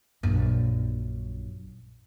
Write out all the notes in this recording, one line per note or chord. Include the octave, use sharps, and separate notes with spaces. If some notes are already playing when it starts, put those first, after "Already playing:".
A#1 F#2